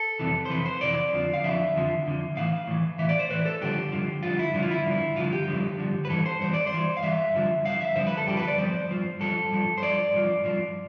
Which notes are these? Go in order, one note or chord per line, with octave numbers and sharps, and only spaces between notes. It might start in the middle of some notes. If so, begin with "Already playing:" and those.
Already playing: A4
F2 C3 E3
C5
F2 C3 E3 B4
C5
F2 C3 E3 D5
F2 D3 F3
F5
F2 D3 F3 E5
F2 D3 F3
F2 D3 F3
A2 E3 F5
A2 E3
A2 E3 E5
D5
C5
A2 E3 B4
A4
G2 D3 F3 G4
G2 D3 F3
G2 D3 F3 F4
E4
G2 D3 F3 E4
F4
E4
G2 D3 F3
G2 D3 F3 F4
G4
G2 D3 F3
G2 D3 F3
B4
G2 E3 A4
C5
G2 E3 C5
D5
C5
G2 E3
F5
G2 E3 E5
G2 D3 F3
G2 D3 F3 F5
E5
G2 D3 F3 C5
B4
A4
G2 D3 F3 G4
B4
D5
G2 F3 C5
G2 F3
G2 F3 A4
G2 F3
C5
G2 F3 D5
G2 F3
G2 F3